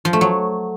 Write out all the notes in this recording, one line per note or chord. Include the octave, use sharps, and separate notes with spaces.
F3
A3
F#3